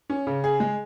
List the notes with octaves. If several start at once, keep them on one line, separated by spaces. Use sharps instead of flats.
C#4
C#3
G#4
G#3